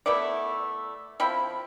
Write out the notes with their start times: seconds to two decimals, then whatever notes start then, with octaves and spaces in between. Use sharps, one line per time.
0.06 A3 B3 E4 D5
1.20 F3 C4 E4 B5